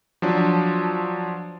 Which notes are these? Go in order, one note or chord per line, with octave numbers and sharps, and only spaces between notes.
F3 F#3 D4